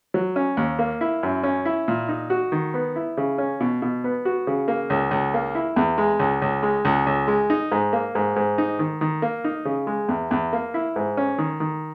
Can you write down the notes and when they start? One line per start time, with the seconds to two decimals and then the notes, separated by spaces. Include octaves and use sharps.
0.14 F#3
0.36 C#4
0.57 D#2
0.79 A#3
1.01 E4
1.23 F#2
1.43 C#4
1.65 E4
1.88 A#2
2.09 D#4
2.30 F#4
2.52 D#3
2.74 B3
2.96 E4
3.17 C#3
3.38 C#4
3.60 B2
3.82 B2
4.04 B3
4.25 F#4
4.47 C#3
4.68 A#3
4.90 C#2
5.11 C#2
5.34 A#3
5.55 E4
5.76 E2
5.98 G#3
6.20 C#2
6.42 C#2
6.63 G#3
6.85 C#2
7.06 C#2
7.28 G#3
7.50 D#4
7.72 G#2
7.93 A#3
8.15 G#2
8.36 G#2
8.58 D#4
8.79 D#3
9.01 D#3
9.22 A#3
9.44 D#4
9.65 C#3
9.87 G#3
10.09 E2
10.31 E2
10.53 A#3
10.74 E4
10.96 G#2
11.17 C#4
11.38 D#3
11.60 D#3